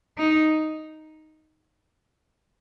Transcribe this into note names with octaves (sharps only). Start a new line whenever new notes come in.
D#4